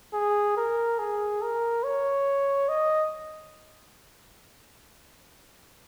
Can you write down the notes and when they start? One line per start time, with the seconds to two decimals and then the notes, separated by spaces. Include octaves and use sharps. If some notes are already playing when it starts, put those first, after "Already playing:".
0.14 G#4
0.57 A#4
0.99 G#4
1.42 A#4
1.84 C#5
2.69 D#5